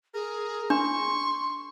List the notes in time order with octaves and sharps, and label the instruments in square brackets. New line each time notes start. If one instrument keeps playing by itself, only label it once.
[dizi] G#4 [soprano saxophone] A#4
[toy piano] D4 [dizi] C6 [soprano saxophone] C#6